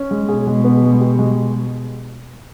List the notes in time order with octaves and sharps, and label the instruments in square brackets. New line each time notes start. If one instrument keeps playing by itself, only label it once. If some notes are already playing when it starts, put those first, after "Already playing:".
Already playing: [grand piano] C#4
G#3
[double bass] B2 [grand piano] G#4
[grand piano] G#3
B3
G#3
G4
G#3